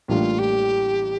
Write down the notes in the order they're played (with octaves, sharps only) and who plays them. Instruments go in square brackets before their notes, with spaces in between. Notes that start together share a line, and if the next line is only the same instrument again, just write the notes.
[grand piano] A1 A2 G3 A#3 D4 [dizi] F4
[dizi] G4